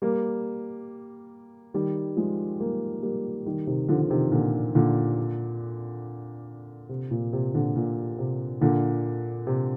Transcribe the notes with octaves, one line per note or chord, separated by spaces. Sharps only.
G3 A#3
D#3 G3
F3 G#3
G3 A#3
G3 A#3
D#3 G3
C3 D#3
D3 F3
D3
C3 D#3
A#2 D3
A#2 D3
C3
A#2
C3
A#2 D3
A#2
C3
A#2 D3
C3